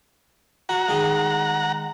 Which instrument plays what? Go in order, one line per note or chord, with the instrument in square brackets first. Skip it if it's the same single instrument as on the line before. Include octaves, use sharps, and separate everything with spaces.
[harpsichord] F#4 [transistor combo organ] F#5 A#5
[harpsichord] D#3 G#3